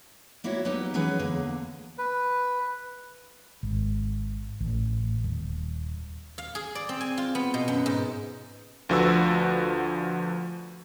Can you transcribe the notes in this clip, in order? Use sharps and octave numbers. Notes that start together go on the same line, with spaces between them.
G3 A#3 E4 F#4 C#5
F#3 A#3 B3 D#4 G4
E3 F#3 C#4 G#4 B4
E2 D3 A#3
B4
G#1
A1
D#1
F5
G#4
D5
C4
G#5
F4
B3
B2
F#2
G#2
D2 D3 F3 F#4 B4 E6